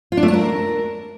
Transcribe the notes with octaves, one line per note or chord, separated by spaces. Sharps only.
F4
D4
A3
D4
A#4